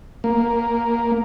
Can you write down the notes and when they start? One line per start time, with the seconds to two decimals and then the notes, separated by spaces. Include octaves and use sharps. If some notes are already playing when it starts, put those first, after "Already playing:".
0.24 A#3